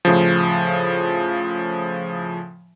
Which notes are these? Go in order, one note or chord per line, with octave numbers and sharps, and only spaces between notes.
A2 C#3 F3